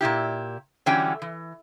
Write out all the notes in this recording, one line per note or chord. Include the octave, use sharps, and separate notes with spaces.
A#2 C#3 E4 G4
D3 E3 F#3 G3 C#4 G5
E3